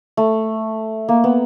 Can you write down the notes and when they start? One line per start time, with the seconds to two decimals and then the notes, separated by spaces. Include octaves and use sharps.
0.17 A3
1.09 A#3
1.24 B3